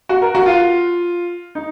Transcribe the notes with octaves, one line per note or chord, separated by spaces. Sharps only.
F#4
A#4
F#4
F4
D#4